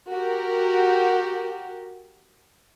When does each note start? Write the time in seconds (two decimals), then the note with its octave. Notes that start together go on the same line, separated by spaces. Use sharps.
0.12 F#4 G4 A#4